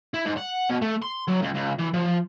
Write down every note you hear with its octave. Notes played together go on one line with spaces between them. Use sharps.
E4
G#2
F#5
B2
A3
C6
F#3
C#2
C#2
E3
F3